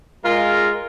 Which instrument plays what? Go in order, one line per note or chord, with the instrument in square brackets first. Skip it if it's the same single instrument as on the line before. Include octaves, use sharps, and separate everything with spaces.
[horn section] G#3 F4 A#4